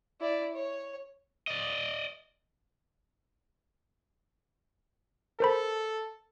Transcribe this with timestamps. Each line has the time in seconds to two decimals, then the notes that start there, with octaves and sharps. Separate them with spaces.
0.20 E4 D5
0.54 C#5
1.48 D5 D#5
5.40 A4 A#4 C5 B5